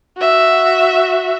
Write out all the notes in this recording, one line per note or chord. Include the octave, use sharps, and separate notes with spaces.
F#4 E5